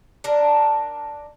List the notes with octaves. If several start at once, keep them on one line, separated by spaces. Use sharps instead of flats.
D4 A#4